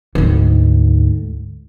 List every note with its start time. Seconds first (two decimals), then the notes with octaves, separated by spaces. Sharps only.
0.15 D2 G#2